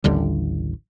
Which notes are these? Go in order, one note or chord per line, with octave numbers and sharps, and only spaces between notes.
A1 D#2 D3 G3